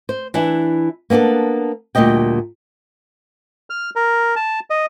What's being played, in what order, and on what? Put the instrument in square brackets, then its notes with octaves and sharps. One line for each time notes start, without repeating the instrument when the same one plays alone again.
[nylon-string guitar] C5
E3 D4 E4
A#3 B3 C#4 D4 A4
D2 A#2 G3 D#5 G5
[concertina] F6
A#4
A5
D#5